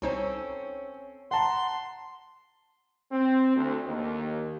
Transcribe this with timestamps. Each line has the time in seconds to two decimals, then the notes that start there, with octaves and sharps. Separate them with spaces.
0.02 C2 C4 C#4 D#4 A4 C5 C#5
1.31 F#5 A5 A#5 C6
3.12 C4
3.55 D2
3.86 D#2